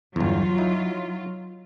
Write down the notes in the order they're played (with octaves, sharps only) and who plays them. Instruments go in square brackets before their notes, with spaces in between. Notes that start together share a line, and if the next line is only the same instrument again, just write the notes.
[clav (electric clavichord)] G1 E2 [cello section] F#3 F4
[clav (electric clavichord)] D#4 E4